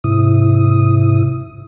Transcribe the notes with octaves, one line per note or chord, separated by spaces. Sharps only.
G#2 C3 E4 D#6